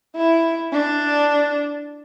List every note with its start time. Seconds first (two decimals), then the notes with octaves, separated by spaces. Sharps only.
0.16 E4
0.72 D4